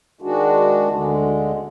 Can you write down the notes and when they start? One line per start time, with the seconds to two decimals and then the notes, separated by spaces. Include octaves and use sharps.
0.21 D#3 G#3 D4 F#4
0.89 D2 D3 G#3